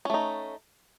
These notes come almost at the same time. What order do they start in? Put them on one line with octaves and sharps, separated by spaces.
C#4 A3 D#4